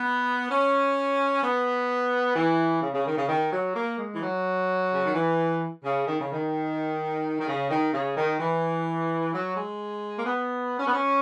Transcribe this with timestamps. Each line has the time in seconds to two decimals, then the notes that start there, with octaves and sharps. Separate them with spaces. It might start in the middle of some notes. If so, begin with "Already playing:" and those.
Already playing: B3
0.50 C#4
1.43 B3
2.36 E3
2.82 C#3
2.94 C#3
3.06 D#3
3.17 C#3
3.29 D#3
3.52 F#3
3.75 A#3
3.98 G#3
4.13 E3
4.22 F#3
4.92 C#3
5.03 D#3
5.15 E3
5.84 C#3
6.07 D#3
6.20 C#3
6.32 D#3
7.40 D#3
7.47 C#3
7.70 D#3
7.93 C#3
8.17 D#3
8.40 E3
9.33 F#3
9.56 G#3
10.18 A#3
10.26 B3
10.79 C#4
10.87 B3
10.93 C#4